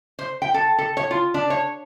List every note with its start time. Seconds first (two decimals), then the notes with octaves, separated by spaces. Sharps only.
0.19 C5
0.42 G5
0.54 A4
0.78 A4
0.97 C#5
1.11 F4
1.34 D4
1.50 C#5